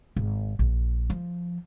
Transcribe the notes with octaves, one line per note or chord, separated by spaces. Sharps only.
G#1
A#1
F3